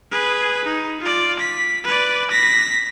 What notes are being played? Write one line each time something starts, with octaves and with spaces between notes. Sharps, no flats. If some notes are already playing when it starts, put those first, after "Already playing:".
G#4 B4
D#4
F4 D5
B6
B4 D5
A#6 B6